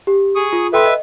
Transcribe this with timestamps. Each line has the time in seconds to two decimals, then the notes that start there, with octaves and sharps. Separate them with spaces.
0.07 G4
0.35 G#4 C#6 D#6
0.53 F4
0.73 A4 B4 E5 G5 C6
0.86 D#5